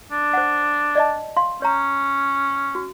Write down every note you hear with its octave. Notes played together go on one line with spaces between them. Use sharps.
D4
C5 F#5
D5 D#5 A5
F5 C6
C#4 C#5 A#5
F#4